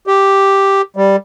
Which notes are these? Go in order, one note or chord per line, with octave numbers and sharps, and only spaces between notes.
G4
G3